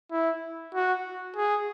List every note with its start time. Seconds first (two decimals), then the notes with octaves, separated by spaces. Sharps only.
0.12 E4
0.75 F#4
1.37 G#4